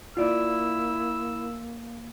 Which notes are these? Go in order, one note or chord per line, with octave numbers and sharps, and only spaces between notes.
A#3 E4 F4 D5 E6